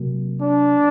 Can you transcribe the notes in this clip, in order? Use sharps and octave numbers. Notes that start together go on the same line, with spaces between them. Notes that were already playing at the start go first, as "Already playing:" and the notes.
Already playing: C3 F#3 A#3
D4